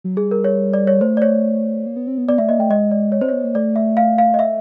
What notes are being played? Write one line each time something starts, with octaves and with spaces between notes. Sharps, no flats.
F#3
G3 G#4
A#4
C#5
D5
C#5
A3 C5
D5
C#5
A#3
B3
C4
B3
B3 D5
A3 E5
A#3 D#5
A3 G5
G#3 D#5
D5
C#5
C4 C5
B3 C#5
A#3
A3 D5
E5
F5
F5
D#5
E5